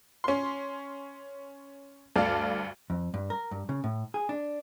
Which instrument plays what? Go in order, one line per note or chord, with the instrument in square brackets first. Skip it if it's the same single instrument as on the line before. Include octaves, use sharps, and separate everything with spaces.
[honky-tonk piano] C#4 C6
D2 G2 A4 D5 F5
[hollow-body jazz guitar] F2
G2
A#4
G2
C#3
A2
G#4
D4